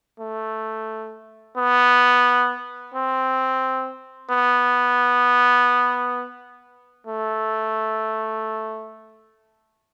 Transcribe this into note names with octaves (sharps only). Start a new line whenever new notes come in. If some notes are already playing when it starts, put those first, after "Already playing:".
A3
B3
C4
B3
A3